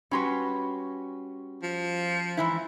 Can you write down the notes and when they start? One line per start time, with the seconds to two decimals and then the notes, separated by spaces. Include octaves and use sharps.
0.11 G3 C#4 F#4 B4 C6 C#6
1.62 F3
2.37 G#2 E3 E4